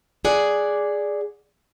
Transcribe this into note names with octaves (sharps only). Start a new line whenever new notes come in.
G#4 D5 F#5